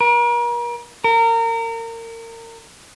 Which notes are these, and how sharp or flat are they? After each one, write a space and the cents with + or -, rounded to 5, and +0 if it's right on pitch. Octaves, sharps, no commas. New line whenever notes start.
A#4 +40
A#4 -30